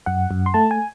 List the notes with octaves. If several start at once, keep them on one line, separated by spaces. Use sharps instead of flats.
F#2 F#5
F#2
C6
A3 A5
G#5